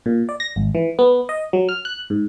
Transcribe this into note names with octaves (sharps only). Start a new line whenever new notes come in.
A#2
D5
A#6
G#1
E3
B3
D#5
F#3
F6
F#6
G#2